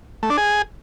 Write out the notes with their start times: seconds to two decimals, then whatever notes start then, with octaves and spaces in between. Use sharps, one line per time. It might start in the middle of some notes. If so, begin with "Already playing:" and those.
0.23 A3
0.30 D4
0.37 G#4